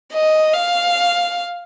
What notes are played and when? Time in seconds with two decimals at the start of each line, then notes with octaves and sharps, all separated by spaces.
0.13 D#5
0.53 F5